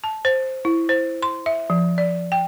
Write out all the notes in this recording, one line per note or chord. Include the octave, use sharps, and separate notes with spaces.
A5
C5
E4
C5
C6
E5
F3
D5
G5